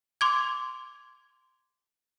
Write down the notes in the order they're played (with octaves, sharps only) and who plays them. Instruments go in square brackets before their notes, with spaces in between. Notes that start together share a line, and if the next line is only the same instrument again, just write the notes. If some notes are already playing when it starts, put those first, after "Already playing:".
[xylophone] C6 D6 G#6